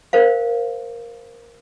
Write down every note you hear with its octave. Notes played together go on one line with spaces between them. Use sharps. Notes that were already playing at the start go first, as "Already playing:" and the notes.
A#4 C5 F5